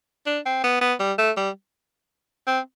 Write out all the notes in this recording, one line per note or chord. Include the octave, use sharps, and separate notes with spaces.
D4
C4
B3
B3
G3
A3
G3
C4